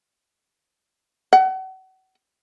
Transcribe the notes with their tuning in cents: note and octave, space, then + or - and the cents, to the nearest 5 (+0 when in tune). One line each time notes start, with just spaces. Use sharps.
F#5 +35